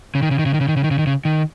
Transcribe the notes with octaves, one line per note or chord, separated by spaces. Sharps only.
C#3
D#3
C#3
D#3
C#3
D#3
C#3
D#3
C#3
D#3
C#3
D#3
C#3
D#3